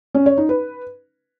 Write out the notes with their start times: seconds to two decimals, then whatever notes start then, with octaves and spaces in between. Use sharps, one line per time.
0.15 C#4
0.26 C#5
0.38 D#4
0.49 B4